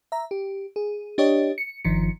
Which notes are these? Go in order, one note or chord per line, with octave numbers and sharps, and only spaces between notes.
E5 A#5
G4
G#4
D4 G4 C#5 D#5
C#7
G1 D#3 F3 C#7